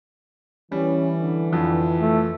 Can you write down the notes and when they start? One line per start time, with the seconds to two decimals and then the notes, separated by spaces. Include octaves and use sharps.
0.72 E3 G3 C#4
1.21 D3
1.53 F2 F3
1.99 A3